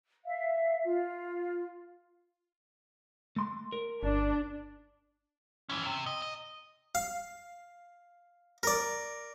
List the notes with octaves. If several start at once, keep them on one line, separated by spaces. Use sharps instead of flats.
E5 F5
F4
A3 C6
A#4
G1 D4
E3 C#4
C3
D#5
D#5
F5
A#4 D5